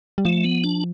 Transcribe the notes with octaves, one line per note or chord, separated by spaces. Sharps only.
G3
F3 A3
B3
D4